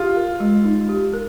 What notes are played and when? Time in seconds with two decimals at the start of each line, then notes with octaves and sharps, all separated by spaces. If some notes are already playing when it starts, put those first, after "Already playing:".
Already playing: F4 G4
0.16 A#4
0.40 G#3
0.64 D#4
0.89 G4
1.14 A#4